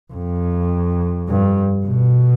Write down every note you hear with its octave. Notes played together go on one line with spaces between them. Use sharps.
F2
G2
B2